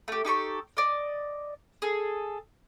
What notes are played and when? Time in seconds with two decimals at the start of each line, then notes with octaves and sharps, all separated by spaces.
0.08 A3 G4
0.25 D#4 G4 A4 C#6
0.77 D5 D#5
1.82 G#4 A4